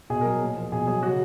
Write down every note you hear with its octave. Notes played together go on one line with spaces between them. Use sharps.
B2 G#4
F#3 A#4
A#2
F3
B2 G#4
F#3 G#4
C#3 F#4